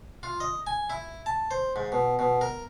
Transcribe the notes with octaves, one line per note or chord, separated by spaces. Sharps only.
F4
D#5
G#5
E4
A5
C5
G#2
B2
B2
A#4